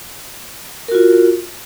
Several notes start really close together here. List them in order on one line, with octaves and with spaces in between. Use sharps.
A#4 F#4 F4